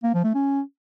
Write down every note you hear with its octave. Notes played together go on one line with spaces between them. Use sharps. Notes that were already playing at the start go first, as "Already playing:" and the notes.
A#3
F3
A3
C#4